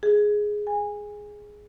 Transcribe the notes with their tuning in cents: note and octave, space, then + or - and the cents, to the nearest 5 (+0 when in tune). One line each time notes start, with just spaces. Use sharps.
G#4 +5
G#5 -20